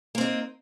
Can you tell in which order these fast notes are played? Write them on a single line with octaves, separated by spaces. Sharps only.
A#3 C4 D#4